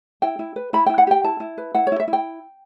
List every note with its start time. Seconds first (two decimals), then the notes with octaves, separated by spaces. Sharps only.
0.22 E4 G5
0.39 E4
0.56 B4
0.73 E4 B5
0.86 E4 G5
0.98 F#5
1.07 G4 G5
1.24 E4 A5
1.40 E4
1.58 B4
1.74 E4 F#5
1.87 C#5
1.92 E4
2.00 E5
2.08 E4
2.13 G5